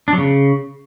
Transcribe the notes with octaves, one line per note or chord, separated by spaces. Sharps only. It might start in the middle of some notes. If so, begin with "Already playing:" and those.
D4
F#3
C#3